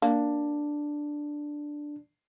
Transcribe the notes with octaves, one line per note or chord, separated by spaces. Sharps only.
A#3 D4